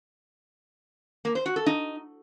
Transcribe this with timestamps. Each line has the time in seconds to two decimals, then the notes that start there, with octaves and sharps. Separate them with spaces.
1.25 A#3
1.35 C5
1.46 F#4
1.56 A4
1.66 D#4